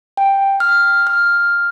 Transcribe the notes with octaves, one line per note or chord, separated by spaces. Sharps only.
G5
F6
F6